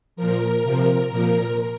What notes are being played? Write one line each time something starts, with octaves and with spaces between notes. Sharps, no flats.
A#2 F3 A#4
C3 F3
A#2 F3 A#4